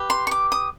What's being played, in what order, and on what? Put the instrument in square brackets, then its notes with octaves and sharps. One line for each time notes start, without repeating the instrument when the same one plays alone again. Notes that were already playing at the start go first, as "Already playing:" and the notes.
Already playing: [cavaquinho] G4 B4
C6
C#6
D6
D#6